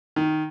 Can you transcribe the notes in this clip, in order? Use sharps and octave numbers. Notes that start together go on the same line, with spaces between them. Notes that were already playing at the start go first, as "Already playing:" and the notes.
D#3